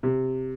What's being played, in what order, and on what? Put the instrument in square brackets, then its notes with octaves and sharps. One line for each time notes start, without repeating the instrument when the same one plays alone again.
[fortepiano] C3